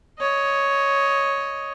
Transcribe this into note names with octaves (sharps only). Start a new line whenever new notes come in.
C#5 D#5